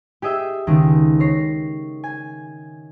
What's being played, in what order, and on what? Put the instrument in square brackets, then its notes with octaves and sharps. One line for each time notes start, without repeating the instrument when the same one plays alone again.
[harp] G4 G#4 D#5 E5
C#2 D#3
C#5 A#6 C7
G#5